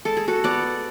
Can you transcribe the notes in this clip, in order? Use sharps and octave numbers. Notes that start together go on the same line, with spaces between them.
G#3 A4
G#4
F#4 A4
B3 D5 F#5